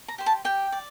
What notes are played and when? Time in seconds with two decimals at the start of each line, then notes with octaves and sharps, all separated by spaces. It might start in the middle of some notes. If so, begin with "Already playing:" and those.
0.08 A#5
0.18 G4 C5
0.26 A5
0.45 G4 G5
0.72 D5